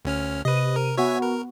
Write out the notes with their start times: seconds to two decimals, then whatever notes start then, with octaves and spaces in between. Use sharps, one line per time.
0.05 D2 C#4 F6
0.45 C3 B4 D#5 D#7
0.76 A#4
0.98 B3 F#4 C#5 E5 G#5
1.22 A#4